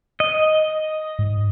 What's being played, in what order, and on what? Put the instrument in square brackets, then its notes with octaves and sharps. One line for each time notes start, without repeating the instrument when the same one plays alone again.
[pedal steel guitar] D#5
[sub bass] G#2